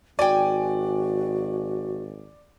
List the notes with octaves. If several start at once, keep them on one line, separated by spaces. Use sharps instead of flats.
G#1 F#4 D5 G5 G#5